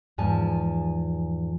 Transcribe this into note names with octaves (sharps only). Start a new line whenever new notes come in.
E2 G#2 F3 G#5 A5